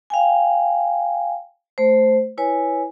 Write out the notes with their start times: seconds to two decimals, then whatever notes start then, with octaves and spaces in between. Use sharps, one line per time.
0.10 F5 G5 G#5
1.78 A3 C5
2.37 E4 B4 C#5 G#5